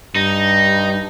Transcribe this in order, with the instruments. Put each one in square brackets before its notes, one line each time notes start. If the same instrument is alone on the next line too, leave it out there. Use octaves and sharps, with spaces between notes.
[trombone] G2 [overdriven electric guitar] D#4